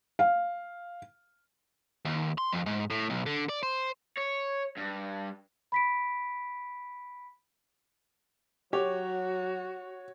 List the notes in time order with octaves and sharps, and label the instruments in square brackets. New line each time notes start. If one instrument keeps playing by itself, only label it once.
[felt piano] F5
[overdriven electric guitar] D#2
C6
F2
G#2
A2
B1
D3
D5
C5
C#5
G2
[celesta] B5 B6 D7
[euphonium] F#3 [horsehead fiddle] F#4 [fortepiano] G4 [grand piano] C#5